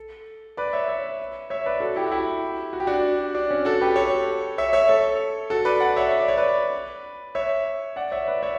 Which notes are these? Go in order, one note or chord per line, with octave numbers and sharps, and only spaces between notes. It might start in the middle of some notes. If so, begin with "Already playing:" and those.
Already playing: A4
B4 D5
C#5 E5
C#5 E5
C#5 E5
B4 D5
F#4 A4
E4 G4
F#4
E4 G4
F#4
G4
D4 F#4
D4
C#4
F#4 A4
G4 B4
A4 C#5
C#5 E5
C#5 E5
A4 C#5
F#4 A4
B4 D5
D5 F#5
C#5 E5
E5
D5
C#5
B4 D5
C#5 E5
D5 F#5
C#5 E5
B4 D5
C#5 E5